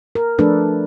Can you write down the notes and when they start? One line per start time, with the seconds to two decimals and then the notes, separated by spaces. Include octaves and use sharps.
0.15 A#4
0.39 F3 A3 D4 A4 B4